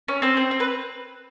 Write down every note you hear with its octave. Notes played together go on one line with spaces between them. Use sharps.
C#4
C4 C5
C4
C4
B4